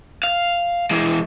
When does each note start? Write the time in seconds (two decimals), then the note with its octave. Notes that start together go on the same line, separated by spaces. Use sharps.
0.24 F5
0.91 E3 G#3